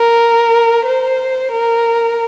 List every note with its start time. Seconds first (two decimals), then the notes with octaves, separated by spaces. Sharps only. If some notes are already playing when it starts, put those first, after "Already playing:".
Already playing: A#4
0.86 C5
1.52 A#4